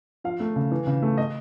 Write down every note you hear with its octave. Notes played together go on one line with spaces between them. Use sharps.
F3 F5
A3
C#3
E3
C#3
A3
D#5